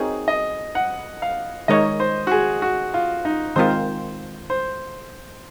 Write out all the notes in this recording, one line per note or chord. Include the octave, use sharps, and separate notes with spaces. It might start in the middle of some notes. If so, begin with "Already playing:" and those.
Already playing: C4 D#4 F#4 G#4 A#4 C#5
D#5
F#5
F5
D#3 G#3 D#4 A#4 C#5 D#5
C5
F#4
G#4
F#4
F4
D#4
D#3 G#3 C4 F4 A#4 C5
C5